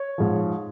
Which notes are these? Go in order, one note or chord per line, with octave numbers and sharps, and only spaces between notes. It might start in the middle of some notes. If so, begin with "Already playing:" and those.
Already playing: C#5
G#2 F3